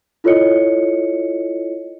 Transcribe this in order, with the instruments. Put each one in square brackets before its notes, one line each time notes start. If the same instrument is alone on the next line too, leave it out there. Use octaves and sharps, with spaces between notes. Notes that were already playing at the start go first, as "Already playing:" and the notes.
[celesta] E4 F4 A4 C#5 D#5 C#7